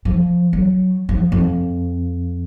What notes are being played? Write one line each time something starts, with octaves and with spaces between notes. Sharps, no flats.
F3
F#3
F3
F2